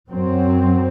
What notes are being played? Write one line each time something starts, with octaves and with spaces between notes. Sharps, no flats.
F#2 F#3 C4